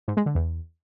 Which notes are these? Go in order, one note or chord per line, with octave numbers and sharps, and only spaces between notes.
G#2
G#3
D3
E2